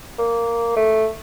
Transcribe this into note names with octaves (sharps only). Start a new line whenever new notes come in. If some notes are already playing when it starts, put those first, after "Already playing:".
A#3
A3